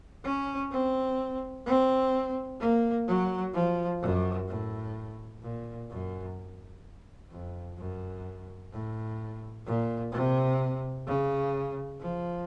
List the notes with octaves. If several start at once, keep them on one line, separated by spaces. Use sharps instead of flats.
C#4
C4
C4
A#3
F#3
F3
F#2
A2
A#2
F#2
F2
F#2
A2
A#2
C3
C#3
F3